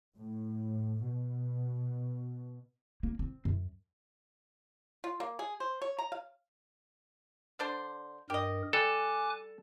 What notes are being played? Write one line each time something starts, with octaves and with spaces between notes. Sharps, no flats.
A2
B2
A#3
C4
F#2
F4
A#3
G#4
C5
C#5
A#5
F5
D3 D4 C5
G2 G4 A#4 D#5
G3 A4 G#5 D6 F#6